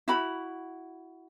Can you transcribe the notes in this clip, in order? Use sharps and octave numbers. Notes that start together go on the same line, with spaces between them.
E4 F#4 B5